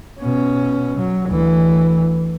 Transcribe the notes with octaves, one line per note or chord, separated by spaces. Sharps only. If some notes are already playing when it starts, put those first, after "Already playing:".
B2 C#4
F#3
D2 E3